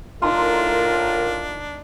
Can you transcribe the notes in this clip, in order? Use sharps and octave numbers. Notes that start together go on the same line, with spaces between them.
A2 D4 D#4 F4 A#4 A#5 C6